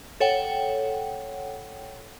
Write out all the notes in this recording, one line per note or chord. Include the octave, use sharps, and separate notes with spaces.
A4 C#5 F#5 G5